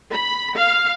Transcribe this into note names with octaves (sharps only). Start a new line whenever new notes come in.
B5
F5